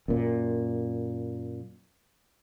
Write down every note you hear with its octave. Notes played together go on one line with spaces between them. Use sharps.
F#2 A#2